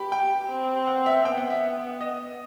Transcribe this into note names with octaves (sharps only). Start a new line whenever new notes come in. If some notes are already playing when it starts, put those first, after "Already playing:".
Already playing: G4 B5
G5
C4
F#5
E5
B3 G5
F#5
E5
D#5